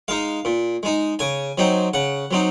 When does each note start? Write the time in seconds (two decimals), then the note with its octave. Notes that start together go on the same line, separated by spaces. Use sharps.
0.08 G#3 D#4 F5
0.45 A#2
0.83 G#3 D#4
1.19 C#3 G#5
1.58 F#3 C4 D#4
1.94 C#3 F#5
2.31 F#3 C4 D#4